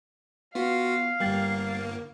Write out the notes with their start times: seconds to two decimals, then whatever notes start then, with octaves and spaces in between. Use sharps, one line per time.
0.55 B3 F4 F#4 F5
1.20 G1 G3 A#3 G5 A6